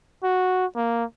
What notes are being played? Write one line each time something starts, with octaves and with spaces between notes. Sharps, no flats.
F#4
A#3